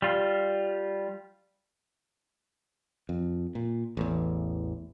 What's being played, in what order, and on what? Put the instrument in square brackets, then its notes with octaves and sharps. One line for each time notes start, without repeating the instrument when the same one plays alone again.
[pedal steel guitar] G3 F4
[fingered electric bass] F2
A#2
A1 E2